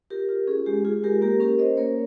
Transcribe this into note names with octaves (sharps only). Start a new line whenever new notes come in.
F4 G4 A#4
F4
C#4 G#4
G#3 G4
F4 G#4
G#3 G4 A#4
A#3 G4 A#4
C#4 G4 A#4
C#4 C5 D#5
A#3 A#4 C#5